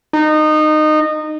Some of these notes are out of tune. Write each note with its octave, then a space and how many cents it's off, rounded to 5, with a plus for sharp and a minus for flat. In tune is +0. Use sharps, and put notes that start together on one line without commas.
D#4 -20